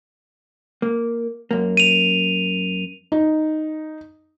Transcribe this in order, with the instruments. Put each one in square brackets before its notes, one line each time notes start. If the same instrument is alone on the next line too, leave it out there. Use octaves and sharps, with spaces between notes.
[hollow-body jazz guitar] A#3
F#2 A#3
[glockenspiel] D#7 F7
[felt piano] D#4